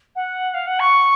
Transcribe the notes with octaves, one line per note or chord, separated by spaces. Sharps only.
F#5
F5
F#5
C#6